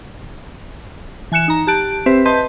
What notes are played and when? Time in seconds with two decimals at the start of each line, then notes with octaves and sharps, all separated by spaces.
1.32 E3 G#5 F#6 C#7 E7
1.48 D#4 A#5
1.67 G4 A5 F#6 D7
2.06 C4 G4 B4 C5 E5
2.25 B4 D#5 A5 C6 G6